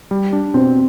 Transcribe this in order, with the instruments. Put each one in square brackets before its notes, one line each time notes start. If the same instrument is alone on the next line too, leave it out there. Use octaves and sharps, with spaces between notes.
[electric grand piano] G3
D4
[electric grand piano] B2 [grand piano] C4